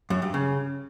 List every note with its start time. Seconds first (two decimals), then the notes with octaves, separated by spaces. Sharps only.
0.10 F#2
0.22 G2
0.34 C#3